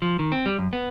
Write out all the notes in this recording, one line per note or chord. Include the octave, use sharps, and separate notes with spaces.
F3
D#3
C4
G3
F#2
B3